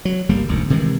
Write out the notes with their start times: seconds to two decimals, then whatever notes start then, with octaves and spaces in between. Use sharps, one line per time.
0.05 F#3
0.29 G1 G3 A#3
0.48 E1 D2 G#2
0.70 C3 D#3 E3 G#3